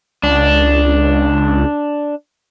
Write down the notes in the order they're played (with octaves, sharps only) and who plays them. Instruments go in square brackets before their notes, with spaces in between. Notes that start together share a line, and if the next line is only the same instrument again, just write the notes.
[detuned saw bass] C#2 [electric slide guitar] D4